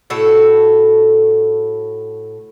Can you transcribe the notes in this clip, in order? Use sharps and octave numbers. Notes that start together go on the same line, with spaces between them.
A2 F#4 A4